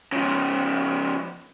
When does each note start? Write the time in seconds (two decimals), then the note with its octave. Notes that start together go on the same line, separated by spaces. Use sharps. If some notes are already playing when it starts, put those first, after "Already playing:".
0.12 C#3 F3